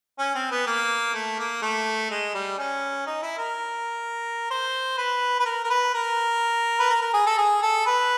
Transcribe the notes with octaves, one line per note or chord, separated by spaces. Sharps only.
C#4
C4
B3
A#3
A3
A#3
A3
G#3
G3
C#4
D#4
E4
A#4
C5
B4
B4
A#4
A#4
B4
A#4
B4
A#4
A#4
G#4
A4
G#4
A4
B4